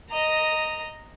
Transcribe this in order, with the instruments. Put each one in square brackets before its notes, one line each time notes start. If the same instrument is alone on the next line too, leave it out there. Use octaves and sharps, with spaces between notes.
[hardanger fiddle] D#5 A#5